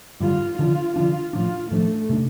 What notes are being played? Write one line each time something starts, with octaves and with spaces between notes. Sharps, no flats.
G2 D3 G3 F4
D3 F3 D4 F4
D3 F3 D4 F4
A2 F3 D4 F4
A2 F3 A3 D4
C3 A3 D4